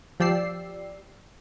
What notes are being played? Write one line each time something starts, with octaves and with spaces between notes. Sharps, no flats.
F3 G4 D5 E6 C7